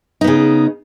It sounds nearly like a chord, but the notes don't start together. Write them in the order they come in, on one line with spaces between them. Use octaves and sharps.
D#4 B3 C#3